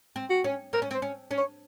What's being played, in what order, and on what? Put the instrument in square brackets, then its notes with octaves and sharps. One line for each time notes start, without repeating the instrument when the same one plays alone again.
[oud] C4
[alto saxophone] F#4
[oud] C#4
[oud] C4 [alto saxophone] A#4
[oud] C#4
C4
[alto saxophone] C5
[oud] C#4
C#4
[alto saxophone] C#5